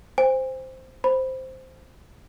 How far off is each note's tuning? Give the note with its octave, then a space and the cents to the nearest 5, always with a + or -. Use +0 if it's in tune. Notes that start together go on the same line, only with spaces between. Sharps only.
C5 +0 G#5 -45
C5 +0 B5 +0